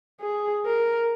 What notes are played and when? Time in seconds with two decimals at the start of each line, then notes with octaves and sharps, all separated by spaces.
0.21 G#4
0.65 A#4